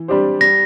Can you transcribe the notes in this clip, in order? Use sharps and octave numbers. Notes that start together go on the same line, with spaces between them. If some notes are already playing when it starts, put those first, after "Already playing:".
Already playing: E3
G3 D4 G4 C5
G3 A#6